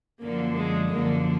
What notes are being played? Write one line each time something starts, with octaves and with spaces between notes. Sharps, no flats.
F#2 D3 F3 A#3
G#3
F#2 D3 F3 A#3